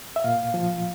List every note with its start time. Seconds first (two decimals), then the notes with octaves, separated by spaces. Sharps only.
0.16 E5
0.24 A#2 F5
0.54 F3